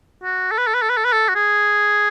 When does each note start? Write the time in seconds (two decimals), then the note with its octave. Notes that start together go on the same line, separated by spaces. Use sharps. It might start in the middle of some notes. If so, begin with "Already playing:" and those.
0.23 F#4
0.51 A4
0.58 B4
0.67 A4
0.74 B4
0.82 A4
0.89 B4
0.97 A4
1.05 B4
1.13 A4
1.29 F#4
1.35 G#4